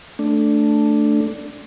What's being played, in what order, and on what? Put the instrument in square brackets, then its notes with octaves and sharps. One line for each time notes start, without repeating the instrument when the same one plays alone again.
[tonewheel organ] A3 D4